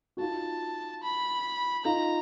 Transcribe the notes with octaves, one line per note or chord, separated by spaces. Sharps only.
F#4
D#4 F4 A5
B5
D#4 F4 A#5